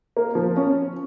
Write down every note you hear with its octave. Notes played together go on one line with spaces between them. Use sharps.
A#3
F3
C#4